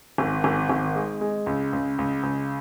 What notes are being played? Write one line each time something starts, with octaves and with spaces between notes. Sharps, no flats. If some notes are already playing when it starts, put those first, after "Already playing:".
G#1
G#1
G#1
G#3
G#3
C#2
C#2
C#2
C#2